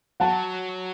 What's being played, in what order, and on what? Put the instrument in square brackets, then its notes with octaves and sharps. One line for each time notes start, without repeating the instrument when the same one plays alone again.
[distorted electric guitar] F#3 [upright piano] F#5 A5